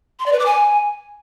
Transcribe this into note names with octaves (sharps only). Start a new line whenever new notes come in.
C6
D5
B4
D6
G#5